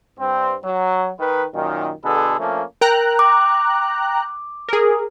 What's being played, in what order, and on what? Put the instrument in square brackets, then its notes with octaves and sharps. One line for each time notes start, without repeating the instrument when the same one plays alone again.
[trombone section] G2 C4
F#3
D#3 B4
F#2 A#2 D#3
B2 D3 G#4 A4 B4
F3 A3 A#3 C#4 D4
[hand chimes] A#4 [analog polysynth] G5 A#5 F#6
[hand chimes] D6
[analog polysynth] G#4 A#4